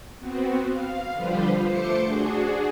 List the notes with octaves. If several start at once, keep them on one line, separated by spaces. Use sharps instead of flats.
B3 C4 F#4
F5
D3 F3 G3 F4 B4 C5
A3 C5 C6 D6 C#7
D4 F#4 G#4